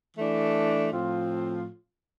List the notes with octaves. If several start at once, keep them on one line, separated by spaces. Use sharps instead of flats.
E3 A3 D4
A2 F3 C4 F4